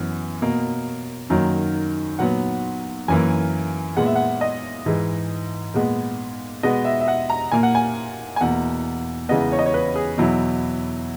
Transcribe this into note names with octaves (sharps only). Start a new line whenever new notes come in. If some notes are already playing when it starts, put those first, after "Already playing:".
Already playing: F#2 E3 B3
B2 A#3
F#2 D#3 F#3 A#3
A#2 F#3 B3 F#5
F#2 E3 A#3 G#5
A#2 G#3 B3 F#5
E5
F#5
D#5
G#2 E3 G#3
A#2 G#3 B3
B2 G#3 B3 D#5
E5
E5
F#5
A#5
A#2 A#3 G#5
F#5
G#5
G#5
E2 B2 A#3 F#5
E2 C#3 E3 G#3 B3 D#5
C#5
D#5
C#5
B4
G#4
E2 B2 F#3 E4